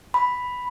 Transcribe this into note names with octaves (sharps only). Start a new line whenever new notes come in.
B5